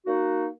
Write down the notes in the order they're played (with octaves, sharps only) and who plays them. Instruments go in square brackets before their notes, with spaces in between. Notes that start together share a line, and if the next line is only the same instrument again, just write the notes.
[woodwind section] A#3 D#4 F#4